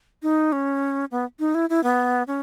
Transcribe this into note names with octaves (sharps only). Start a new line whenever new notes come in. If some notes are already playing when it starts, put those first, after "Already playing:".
D#4
C#4
B3
D#4
E4
E4
B3
C#4